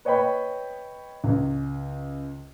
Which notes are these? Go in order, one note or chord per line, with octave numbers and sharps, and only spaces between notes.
B4 C#5 D#5 G5 B5
C#2